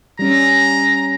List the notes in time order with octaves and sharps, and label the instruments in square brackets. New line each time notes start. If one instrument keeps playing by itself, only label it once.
[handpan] G3 C#4 [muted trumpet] A#5